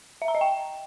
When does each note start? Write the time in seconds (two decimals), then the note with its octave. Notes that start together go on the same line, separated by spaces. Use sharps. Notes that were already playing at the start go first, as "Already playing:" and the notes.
0.22 E5
0.28 A#5
0.35 D#5
0.41 G5